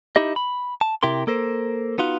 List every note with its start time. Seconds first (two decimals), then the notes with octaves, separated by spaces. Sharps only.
0.16 D#4 E4 G4 D#5
0.36 B5
0.81 A5
1.03 C3 E4 G4 A#4 C6
1.27 A#3 A4 A#4 C5
1.98 B3 D#4 F4 F#4